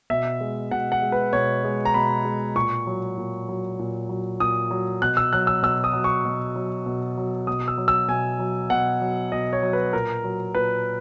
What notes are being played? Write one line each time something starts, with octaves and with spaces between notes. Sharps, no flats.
B2 E5
G#3
B2 F#5
F#5
G#3
B4
B2 C#5
G#3
A#5
B2 B5
G#3
A#2 C#6
F#3
A#2
F#3
A#2
F#3
A#2 D#6
F#3
B2 F#6
E6
F#3 F#6
E6
B2 E6
D#6
F#3
C#6
B2
F#3
B2
F#3
B2 D#6
E6
F#3
E6
B2 G#5
F#3
B2 F#5
F#3
B2 D#5
C#5
F#3
B4
A#2 A#4
F#3
A#2 B4